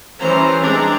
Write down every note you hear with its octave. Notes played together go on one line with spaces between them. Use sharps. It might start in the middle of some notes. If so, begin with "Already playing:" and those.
E3 G3 C#4 C5 A#5
G#3 C4 D4 A#5